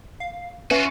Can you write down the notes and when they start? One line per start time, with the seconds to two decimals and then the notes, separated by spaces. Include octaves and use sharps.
0.20 F5
0.71 C#4 F4 F#4 B4 E5